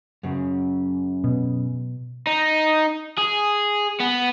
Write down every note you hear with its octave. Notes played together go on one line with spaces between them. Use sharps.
F#2 C#3
B2
D#4
G#4
B3